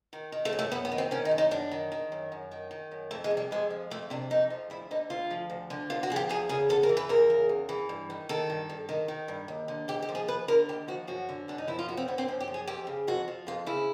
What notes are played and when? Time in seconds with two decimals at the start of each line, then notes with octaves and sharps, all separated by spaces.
0.13 D#3
0.32 D#3
0.45 A3
0.53 F#2
0.59 A3
0.72 F#2 B3
0.85 B3
0.92 D#3
0.98 C4
1.11 D#3 C#4
1.25 D#4
1.31 F#2
1.38 D#4
1.51 F#2 D4
1.71 D#3
1.92 D#3
2.12 F#2
2.32 F#2
2.51 D#3
2.71 D#3
2.92 F#2
3.11 F2 A3
3.24 G#3
3.31 C3
3.37 G3
3.51 F2 G#3
3.70 F3
3.90 F2 A3
4.10 C3 D4
4.30 F2 D#4
4.50 F3
4.70 D2 E4
4.91 D3 D#4
5.10 D2 F4
5.31 F3
5.50 D2
5.70 D3
5.90 D2 F4
6.03 F#4
6.10 F3 G#4
6.16 G4
6.29 E2 G#4
6.49 C#3 G#4
6.69 E2 A4
6.83 A#4
6.89 E3
6.97 B4
7.09 E2 A#4
7.30 C#3
7.49 E2
7.69 E3
7.89 G2
8.10 D#3
8.29 D#3 A4
8.50 G2
8.70 G2
8.89 D#3
9.08 D#3
9.28 G2
9.48 D#2
9.68 D3
9.88 D#2 G4
10.02 G4
10.09 F3
10.15 G#4
10.28 D#2 B4
10.48 D3 A#4
10.68 D#2 G4
10.88 F3 F#4
11.07 F#2 F#4
11.29 D3
11.48 F#2 D4
11.58 D#4
11.67 F3 E4
11.79 F4
11.88 F#2 F#4
11.97 C4
12.08 D3 B3
12.18 C4
12.28 F#2 C#4
12.40 G4
12.48 F3
12.54 G#4
12.68 F2 G4
12.87 C#3
13.07 F2 F#4
13.28 F3
13.47 F2 F4
13.66 C#3 E4